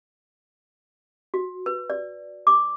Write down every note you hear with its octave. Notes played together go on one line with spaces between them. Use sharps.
F#4
B4
D5
D6